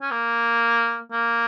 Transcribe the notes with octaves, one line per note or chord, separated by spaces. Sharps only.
C#4
A#3
A#3